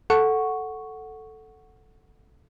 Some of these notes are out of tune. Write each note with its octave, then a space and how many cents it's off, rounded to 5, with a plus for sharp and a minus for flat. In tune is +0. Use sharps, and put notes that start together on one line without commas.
A4 +0 F#5 +0 C#6 +0